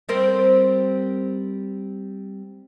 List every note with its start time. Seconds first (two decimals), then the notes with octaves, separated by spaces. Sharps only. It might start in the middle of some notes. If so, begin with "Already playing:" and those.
0.09 G3 C4 A#4